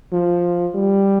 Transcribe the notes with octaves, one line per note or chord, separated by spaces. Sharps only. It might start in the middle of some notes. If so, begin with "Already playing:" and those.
F3
G3